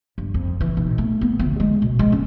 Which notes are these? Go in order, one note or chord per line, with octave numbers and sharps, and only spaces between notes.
G2
F2
E3
B1
A3
B3
D2
G#3
B2
G#3
C#4